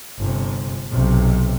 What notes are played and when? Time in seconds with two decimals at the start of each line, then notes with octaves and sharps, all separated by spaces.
0.18 G1 C3
0.91 B1 C3